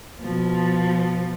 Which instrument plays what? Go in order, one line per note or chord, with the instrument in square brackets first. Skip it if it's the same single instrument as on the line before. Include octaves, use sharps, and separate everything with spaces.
[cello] B2 F3